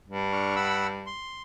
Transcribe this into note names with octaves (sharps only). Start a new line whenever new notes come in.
G2
D4 C#6 F6
F#5 B5 E6
C6